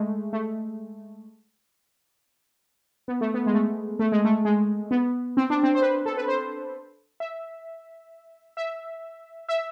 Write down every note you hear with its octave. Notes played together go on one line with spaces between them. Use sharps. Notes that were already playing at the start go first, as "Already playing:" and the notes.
Already playing: G#3 A3
A3
B3
A3
B3
G#3
A3
A3
G#3
A3
G#3
B3
C4
D4
C4
C5
B4
A4
B4
C5
E5
E5
E5